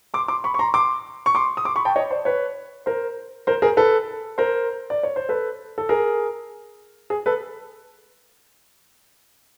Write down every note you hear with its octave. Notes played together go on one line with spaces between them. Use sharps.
C6 D6
C6 D6
B5 C#6
C#6
A#5 C6
C6 D6
C#6
C6 D6
D#6
C6 D6
B5 C#6
G5 A5
C#5 D#5
C5 D5
B4 C#5
A#4 C5
A#4 C5
G#4 A#4
A4 B4
A#4 C5
D5
C#5
C5
A4 B4
A4
G#4 A#4
G#4
A4 B4